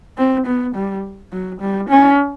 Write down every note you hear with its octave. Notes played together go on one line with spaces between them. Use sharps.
C4
B3
G3
F#3
G3
C#4